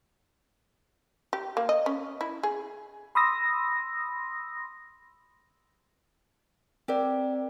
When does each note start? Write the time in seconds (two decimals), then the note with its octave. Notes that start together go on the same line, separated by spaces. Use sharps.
1.33 G4
1.57 A#3
1.69 D#5
1.86 C#4
2.21 E4
2.43 G#4
3.15 B5 C6 D#6 E6 A#6
6.88 C4 G4 A#4 D5